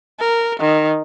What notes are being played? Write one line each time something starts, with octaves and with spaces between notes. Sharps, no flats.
A#4
D#3